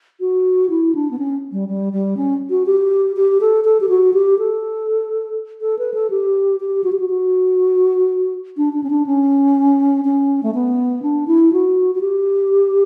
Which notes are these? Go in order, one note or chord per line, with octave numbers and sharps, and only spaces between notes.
F#4
E4
D4
B3
C#4
G3
G3
G3
C#4
F#4
G4
G4
A4
A4
G4
F#4
G4
A4
A4
B4
A4
G4
G4
F#4
G4
F#4
F#4
D4
D4
C#4
D4
C#4
C#4
A3
B3
D4
E4
F#4
F#4
G4